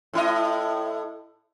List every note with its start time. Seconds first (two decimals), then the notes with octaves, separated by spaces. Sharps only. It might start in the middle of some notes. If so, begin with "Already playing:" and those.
0.13 A2 E4 D#5